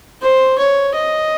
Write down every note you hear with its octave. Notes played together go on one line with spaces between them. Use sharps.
C5
C#5
D#5